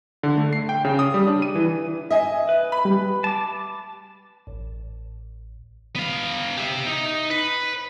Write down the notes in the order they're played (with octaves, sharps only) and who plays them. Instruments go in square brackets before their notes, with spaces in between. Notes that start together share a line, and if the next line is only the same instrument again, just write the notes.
[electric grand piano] D3
A3
C7
G5
C#3
D#6
G3
D4
D#7
E3
[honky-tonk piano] D#5 G#5 [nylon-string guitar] E5
[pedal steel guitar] B4
[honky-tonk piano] B5
[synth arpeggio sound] G3
[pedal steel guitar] A5 D6
[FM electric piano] A1
[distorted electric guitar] B3 F5
G4 E5
D#4
B4